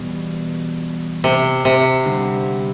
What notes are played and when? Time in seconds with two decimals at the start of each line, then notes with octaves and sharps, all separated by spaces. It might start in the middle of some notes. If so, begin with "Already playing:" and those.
Already playing: E2 B2 G3
1.24 C3
1.65 C3
2.06 D3 G3 C4